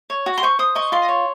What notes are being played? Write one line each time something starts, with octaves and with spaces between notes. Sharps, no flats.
C#5
F#4
C6
C5 C#6
C5 D#6
D#5 C#6
F4 C6
C#5